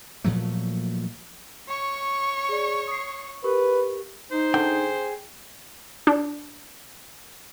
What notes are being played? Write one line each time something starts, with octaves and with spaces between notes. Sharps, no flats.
A#2 F3 F#3 A3
C#5 C#6
G#4 D5
D#6 C7
G4 A#4 B4 C#6
D#4 C5
D3 G#4 G5
D4